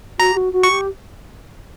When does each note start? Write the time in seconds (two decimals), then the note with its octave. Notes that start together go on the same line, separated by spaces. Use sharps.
0.19 F#4 A#5
0.32 G4
0.36 F#4
0.52 F#4
0.63 G4 C#6